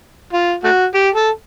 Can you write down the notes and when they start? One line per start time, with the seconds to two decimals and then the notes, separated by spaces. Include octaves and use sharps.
0.33 F4
0.64 A3 F#4
0.94 G4
1.15 A4